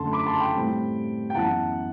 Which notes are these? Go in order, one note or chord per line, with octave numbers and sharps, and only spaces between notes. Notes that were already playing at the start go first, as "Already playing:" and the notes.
Already playing: F#2 D3 A3 A5 C6
B5 D6
A5 C6
G5 B5
A2 G3 C4
G5
F#2 E3 B3 F#5 A5